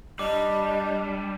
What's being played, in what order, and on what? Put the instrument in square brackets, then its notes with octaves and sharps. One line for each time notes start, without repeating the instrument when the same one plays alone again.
[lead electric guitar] G3 [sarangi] D4 [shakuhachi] D#5 [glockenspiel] D6